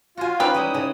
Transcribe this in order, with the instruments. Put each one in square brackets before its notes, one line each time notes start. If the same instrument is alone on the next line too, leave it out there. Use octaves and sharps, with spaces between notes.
[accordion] F4 [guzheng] F#4 G#5
[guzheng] C#4 D#4 [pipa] G4 B4
[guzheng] G3 G#3 E4 [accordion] D#6
[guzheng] C#3